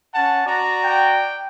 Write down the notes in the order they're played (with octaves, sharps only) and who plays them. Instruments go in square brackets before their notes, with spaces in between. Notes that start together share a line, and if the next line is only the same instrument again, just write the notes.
[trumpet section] C#4 F#5 A5
F#4 D5 A#5
[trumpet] G5